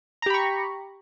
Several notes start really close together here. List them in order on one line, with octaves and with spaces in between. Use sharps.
A#5 G4 B5 C#6